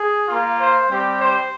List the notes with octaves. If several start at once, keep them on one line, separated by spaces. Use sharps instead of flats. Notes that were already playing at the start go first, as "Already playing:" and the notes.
Already playing: G#4
A#3 F4
C5
G3 C4 G4
C5